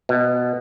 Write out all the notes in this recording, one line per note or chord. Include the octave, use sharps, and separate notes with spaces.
B2